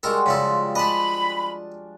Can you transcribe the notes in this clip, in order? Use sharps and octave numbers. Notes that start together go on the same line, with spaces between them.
G3 G#3 F#4 A4 A#4
C#3 F3 G3 F4 A4
D4 D#5 A5 B5